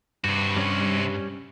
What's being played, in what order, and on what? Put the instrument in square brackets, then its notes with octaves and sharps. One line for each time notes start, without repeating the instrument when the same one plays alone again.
[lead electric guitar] G2 [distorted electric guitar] C3 F#4
[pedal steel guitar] G3 C#4 C#5